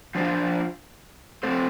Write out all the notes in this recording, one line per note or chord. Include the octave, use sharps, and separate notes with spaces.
F3 D4 F4 C5
A3 C4 A4 C5